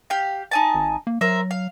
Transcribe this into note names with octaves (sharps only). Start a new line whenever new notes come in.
G4 F5
D#4 G#5 A5
G#1
A#3
F#3 A#4 C5 E5
F5